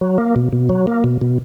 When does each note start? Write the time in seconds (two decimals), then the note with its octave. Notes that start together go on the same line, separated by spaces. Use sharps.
0.01 F#3
0.18 A#3
0.36 B2
0.53 B2
0.69 F#3
0.87 A#3
1.04 B2
1.21 B2